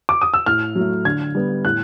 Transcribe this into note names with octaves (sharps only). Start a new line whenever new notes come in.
D6
D#6
E6
A2 F6
F#3 A3
D3 G#6
G3 B3
A2 F#6